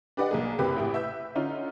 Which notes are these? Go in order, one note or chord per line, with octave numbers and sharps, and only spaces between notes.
D4 G4 B4 D5 D#5 F#5
B1 A#3 G#4
F#1 C3 G4 B4 B5 D6
A1 E4 G4
B4 E5 E6 G6
D3 C#4 D#4 F4